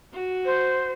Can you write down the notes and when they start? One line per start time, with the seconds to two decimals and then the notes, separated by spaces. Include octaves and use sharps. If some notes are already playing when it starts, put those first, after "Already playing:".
0.13 F#4
0.45 C5